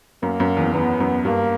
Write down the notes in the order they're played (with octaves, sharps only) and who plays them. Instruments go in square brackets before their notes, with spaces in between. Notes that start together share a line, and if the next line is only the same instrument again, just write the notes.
[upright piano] F#2 [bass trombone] A#3
[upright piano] F#2
E2
[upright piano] E2 [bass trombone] B3
[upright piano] F#2
[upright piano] G2 [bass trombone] A#3